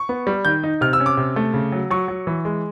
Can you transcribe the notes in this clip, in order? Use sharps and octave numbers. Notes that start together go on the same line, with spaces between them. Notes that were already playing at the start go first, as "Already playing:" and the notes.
Already playing: C#6
B3
G3
D#3 G6
D#4
C3 F6
E6
C#4
D6
C3
A3
C#3
F#3
F#3 C#6
F#3
E3
G#3